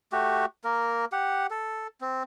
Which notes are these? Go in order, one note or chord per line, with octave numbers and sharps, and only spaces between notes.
A3 F#4 G4
A#3 A#4
G4 F#5
A4
C4